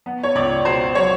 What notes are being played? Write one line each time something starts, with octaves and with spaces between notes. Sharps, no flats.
B3
C#5
C#2 D5
B2 C5
F#3 C#5